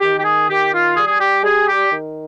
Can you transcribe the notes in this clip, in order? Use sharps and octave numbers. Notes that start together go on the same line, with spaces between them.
D#3 G4
G4
G#4
D#3 G4
F4
G3 G#4
G#4
G4
G3 G#4
G4
D#3